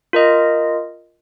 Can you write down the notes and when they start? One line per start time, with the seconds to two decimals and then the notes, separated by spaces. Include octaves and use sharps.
0.13 F4 A#4 D#5